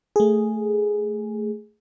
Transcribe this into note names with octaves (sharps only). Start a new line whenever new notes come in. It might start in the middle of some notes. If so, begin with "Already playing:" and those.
A3 G#4